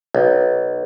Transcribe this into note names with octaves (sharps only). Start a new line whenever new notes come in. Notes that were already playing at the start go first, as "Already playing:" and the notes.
B1